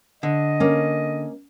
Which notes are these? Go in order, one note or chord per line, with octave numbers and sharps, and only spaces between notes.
D3 D#5
A#3 C#4